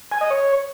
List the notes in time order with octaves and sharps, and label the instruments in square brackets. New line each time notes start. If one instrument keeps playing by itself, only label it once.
[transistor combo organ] G#5
D#5
C#5